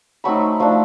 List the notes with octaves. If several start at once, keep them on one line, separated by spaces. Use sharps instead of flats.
F#3 A3 C4 D#4 B5 C#6
F3 A3 D4